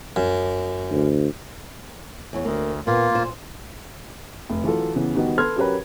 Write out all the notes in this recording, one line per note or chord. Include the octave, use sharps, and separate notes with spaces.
F#2
D2
E2 C#5
D2 A#3
A#2 A#3 B3 F4
A#2 C5
F1
E3 F#3 F4 A4
C#3 E3 B3
D#3 G3 B3 D#4 F#4
A4 B4 C6 F6 G#6
F#3 C#4 G4 A#4 B4